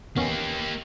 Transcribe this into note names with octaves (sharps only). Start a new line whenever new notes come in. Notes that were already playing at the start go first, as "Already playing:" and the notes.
E2 A#3 B3 C#4 G4